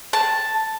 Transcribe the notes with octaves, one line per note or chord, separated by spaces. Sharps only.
A5